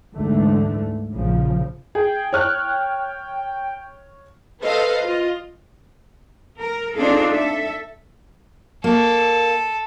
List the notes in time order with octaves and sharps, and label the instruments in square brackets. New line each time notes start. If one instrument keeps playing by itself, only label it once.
[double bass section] D2 G#2 D3 E3 A3
A#1 C#3 F3
[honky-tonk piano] G#4 [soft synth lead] G5
[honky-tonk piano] C#5 F6 F#6
[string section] A4 B4 C5 D#5 F5
F4 D#5
[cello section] A#4
C4 D4 D#4 F4 G#4 A4
A4 E5
[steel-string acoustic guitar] A#3 [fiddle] A4